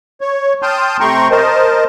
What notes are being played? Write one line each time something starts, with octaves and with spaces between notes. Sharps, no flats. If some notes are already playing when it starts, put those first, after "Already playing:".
C#5
G5 A5 C6 D#6 F6 G6
C3 A3 G5 A#5 C6 C#6
A#4 C5 D#5 A5